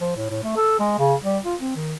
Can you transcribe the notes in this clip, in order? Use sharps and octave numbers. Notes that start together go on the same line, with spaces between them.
F3
A2
A2
A3
A4
G#3
C#3
G3
F4
C4
D#3